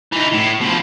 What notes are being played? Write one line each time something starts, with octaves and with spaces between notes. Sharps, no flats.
E3 D#4
A2
B2 F3